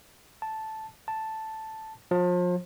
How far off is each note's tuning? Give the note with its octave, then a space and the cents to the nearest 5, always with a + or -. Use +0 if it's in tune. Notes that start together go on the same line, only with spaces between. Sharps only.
A5 -5
A5 +0
F3 +35